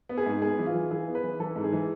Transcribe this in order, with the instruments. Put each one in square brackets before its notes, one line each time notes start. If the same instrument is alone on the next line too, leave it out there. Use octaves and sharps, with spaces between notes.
[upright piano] B3
G#4
G#2
B3 G#4
E3
F4
E3
E3 G#4
B3
B4
E3
E3 A4
G#2
G#4
E3